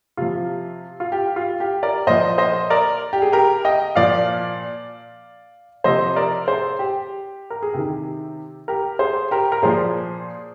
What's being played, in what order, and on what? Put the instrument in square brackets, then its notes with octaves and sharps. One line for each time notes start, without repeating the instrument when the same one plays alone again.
[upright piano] C3 F3 F4
F4
G4
F4
G4
A#4 D5
A#2 F3 C5 D#5
C5 D#5
A#4 D5
G4
G#4
G4 A#4
D#5 G5
A#2 F3 D5 F5
C3 F3 C5 D#5
A#4 D5
G#4 C5
G4
A#4
G#4
C3 D#3 G4
G4 A#4
G#4 C5
G4 A#4
A#4
A#2 F3 G#4 C5